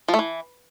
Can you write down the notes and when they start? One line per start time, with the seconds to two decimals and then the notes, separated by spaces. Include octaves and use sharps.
0.08 F3
0.14 A3
0.19 E3